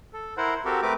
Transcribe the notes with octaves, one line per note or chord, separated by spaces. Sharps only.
A4
E4 A#4 C5 F#5
C4 F#4 G4 A4 A#4
A3 C4 A#4 B4 D6